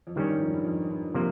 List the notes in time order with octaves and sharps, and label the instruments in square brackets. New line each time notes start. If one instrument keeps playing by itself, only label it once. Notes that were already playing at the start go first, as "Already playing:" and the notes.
[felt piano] F2
[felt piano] G2 [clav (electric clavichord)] D#3 G3 C#4
[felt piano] G#2
F2
G2
F2
G2
[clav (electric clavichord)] C3 F3 A#3